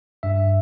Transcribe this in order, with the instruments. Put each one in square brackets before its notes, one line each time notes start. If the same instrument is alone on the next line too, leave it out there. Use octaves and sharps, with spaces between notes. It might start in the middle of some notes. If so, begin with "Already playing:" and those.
[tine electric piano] G2 E5